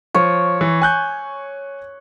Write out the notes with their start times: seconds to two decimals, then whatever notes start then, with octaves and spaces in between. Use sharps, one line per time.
0.14 F3 C#5
0.61 E3
0.82 G#5 F#6 G6